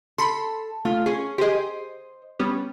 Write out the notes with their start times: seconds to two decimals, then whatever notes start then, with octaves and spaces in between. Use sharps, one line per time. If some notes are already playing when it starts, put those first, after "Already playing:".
0.18 A4 B5 C6
0.85 A3 F4
1.06 C#4 G#4
1.38 G4 G#4 C5 D#5
2.39 G3 B3 C#4